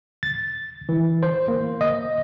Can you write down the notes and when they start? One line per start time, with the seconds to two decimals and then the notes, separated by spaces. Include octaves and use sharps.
0.23 A6
0.89 E3
1.23 C5
1.48 A#3
1.81 D#5